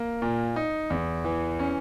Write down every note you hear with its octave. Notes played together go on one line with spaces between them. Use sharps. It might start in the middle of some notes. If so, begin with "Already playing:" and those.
Already playing: A#3
A#2
D#4
E2
E3
C#4